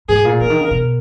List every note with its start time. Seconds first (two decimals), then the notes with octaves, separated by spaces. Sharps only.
0.09 G#2 G#4
0.25 A#2
0.40 C#3 A#4
0.50 D#3
0.61 C#3
0.71 B2